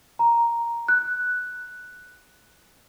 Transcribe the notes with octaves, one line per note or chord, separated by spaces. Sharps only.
A#5
F#6